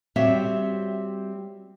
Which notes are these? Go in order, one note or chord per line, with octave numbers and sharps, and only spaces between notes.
G3 C4 F#4 C#5 E5